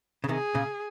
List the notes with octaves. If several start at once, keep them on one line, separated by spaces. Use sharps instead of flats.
C#3
C3 D#3 G#4
A#2 C#3